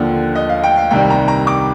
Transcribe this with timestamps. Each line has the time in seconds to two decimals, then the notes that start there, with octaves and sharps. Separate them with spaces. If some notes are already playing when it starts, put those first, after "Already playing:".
Already playing: D#2 D3 F3
0.35 D#5
0.49 F5
0.64 G5
0.77 F5
0.91 C2 C3 D#3 G3 G5
1.10 A#5
1.28 A#5
1.47 D6